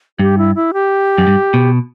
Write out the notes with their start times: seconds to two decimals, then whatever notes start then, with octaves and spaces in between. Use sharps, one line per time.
0.19 G2 G4
0.38 E4
0.55 E4
0.73 G4
1.18 F#2
1.27 G2
1.54 B2